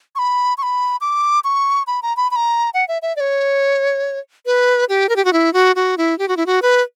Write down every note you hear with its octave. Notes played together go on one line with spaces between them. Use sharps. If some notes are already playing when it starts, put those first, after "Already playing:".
C#6
B5
C#6
B5
D6
C#6
B5
A#5
B5
B5
A#5
F#5
E5
E5
D5
C#5
B4
G4
A#4
G4
F#4
E4
F#4
F#4
E4
G4
F#4
E4
F#4
B4